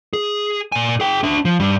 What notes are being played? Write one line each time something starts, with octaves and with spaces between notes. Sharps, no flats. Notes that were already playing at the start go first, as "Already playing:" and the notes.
G#4
A#2 G#5
G#4 G5
D4 E5
F3
G2 G3